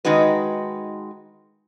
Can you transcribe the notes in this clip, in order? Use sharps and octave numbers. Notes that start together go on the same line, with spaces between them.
D#3 G#3 D#4 F#4 B4